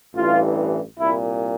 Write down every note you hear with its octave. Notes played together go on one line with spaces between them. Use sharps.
A1 G2 E3 F4
C2 A#2 E4